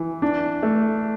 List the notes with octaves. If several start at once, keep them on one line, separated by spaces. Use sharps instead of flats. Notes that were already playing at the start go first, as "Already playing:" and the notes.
Already playing: E3
D4
A3